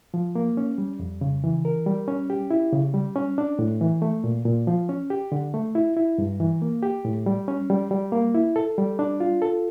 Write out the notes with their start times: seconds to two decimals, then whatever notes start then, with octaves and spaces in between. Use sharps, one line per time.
0.14 F3
0.35 A#3
0.57 C#4
0.78 G3
0.99 F2
1.21 C#3
1.44 E3
1.65 A#4
1.86 G3
2.08 C#4
2.30 G4
2.51 E4
2.73 C#3
2.94 G3
3.16 C#4
3.38 D4
3.59 A2
3.81 E3
4.02 A3
4.24 A#2
4.45 A#2
4.67 F3
4.89 C#4
5.10 G4
5.32 D3
5.54 A3
5.75 E4
5.97 E4
6.18 G2
6.40 E3
6.62 A#3
6.83 G4
7.05 A2
7.26 G3
7.48 C#4
7.70 G3
7.91 G3
8.12 A#3
8.35 E4
8.56 A4
8.78 G3
8.99 D4
9.20 F4
9.42 A4